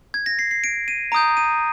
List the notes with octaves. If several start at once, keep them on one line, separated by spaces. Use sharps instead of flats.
G#6
A#6
C7
C7
D7
D#7
A#5 D#6 G6 D7
D#7